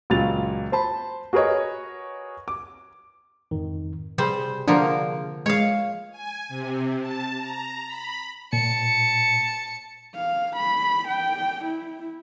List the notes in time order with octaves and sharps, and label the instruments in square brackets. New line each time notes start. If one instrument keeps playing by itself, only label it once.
[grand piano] C#2 A#2 F#3 A6 F7
C5 A5 B5
F#4 G#4 A#4 B4 C#5 D#5
D6
[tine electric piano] F2 G#2 D#3
[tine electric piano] C3 G#4 [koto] G3 C5
[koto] D3 F3 A#3 [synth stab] D4 A#4
[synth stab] G#3 [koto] C#5 F5
[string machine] G#5
C3
A5
A#5
B5
[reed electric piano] A#2 [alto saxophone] A5 [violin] C#7
[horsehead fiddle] F5
B5
G5
E4